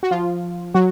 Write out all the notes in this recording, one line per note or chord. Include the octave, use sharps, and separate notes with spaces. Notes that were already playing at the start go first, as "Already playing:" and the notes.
F#4
F3 F4
F#3 F#4